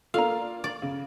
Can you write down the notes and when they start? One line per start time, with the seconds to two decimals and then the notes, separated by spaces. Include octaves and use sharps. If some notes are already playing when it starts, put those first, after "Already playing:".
0.14 A#3 D4 F4 A4 F5 A#5
0.64 D5
0.82 C#3